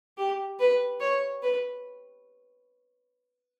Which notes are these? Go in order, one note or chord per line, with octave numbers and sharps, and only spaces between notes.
G4
B4
C#5
B4